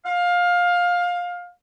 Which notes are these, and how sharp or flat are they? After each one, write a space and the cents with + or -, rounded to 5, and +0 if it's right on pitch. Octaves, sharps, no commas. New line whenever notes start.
F5 +20